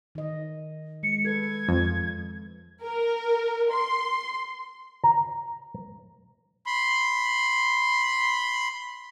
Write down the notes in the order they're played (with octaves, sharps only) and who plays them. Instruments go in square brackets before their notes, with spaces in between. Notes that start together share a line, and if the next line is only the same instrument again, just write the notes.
[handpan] D#3 D#5
[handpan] G#3 [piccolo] C#7
[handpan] A4 B4 [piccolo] G#6
[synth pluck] F2
[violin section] A#4
C6
[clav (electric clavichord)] A#5
[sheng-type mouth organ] B5 C6